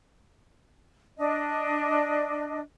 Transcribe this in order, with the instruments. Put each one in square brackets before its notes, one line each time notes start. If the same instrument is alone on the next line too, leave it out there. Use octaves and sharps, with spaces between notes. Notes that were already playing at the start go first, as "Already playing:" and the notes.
[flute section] D4 D#5